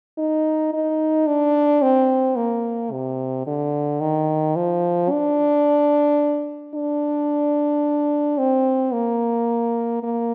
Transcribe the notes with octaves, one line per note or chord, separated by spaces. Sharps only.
D#4
D#4
D4
C4
A#3
C3
D3
D#3
F3
D4
D4
C4
A#3
A#3